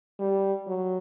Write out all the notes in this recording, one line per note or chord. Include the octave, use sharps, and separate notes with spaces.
G3
F#3